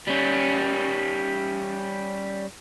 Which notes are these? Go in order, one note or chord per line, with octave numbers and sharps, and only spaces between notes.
G3 C#4